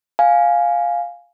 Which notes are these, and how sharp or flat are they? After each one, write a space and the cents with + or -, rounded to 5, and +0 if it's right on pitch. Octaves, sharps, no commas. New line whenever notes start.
F5 +5 G#5 +0